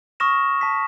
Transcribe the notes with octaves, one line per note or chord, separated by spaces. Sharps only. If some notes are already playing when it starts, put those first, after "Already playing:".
C#6 D#6 F6 A#6 E7
A5 B6